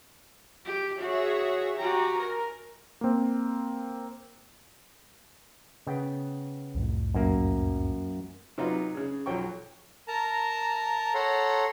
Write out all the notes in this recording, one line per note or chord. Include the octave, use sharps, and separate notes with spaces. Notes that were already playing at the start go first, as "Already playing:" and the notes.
G4
F#4 G#4 C#5 E5
F#4 G4 G#5 A#5
A#4
A#3 C4
C#3 B3 G5
C2 F2 A2
F#2 A#3
C3 F#3 D#4 F4 B4
C#3 G#4
B1 F3 F#3 G5 C#6
A#4 A5 A#5
A4 C#5 F#5 A#5 C6